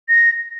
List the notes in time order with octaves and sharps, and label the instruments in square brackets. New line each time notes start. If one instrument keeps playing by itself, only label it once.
[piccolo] A#6